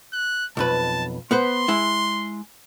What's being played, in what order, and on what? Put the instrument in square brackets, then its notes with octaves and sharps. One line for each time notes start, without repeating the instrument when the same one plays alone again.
[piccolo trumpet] F#6
[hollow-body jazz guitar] B1 F2 B4 [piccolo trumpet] A5
[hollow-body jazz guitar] B3 B4 C5 [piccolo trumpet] C6
[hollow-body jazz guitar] G#3 E4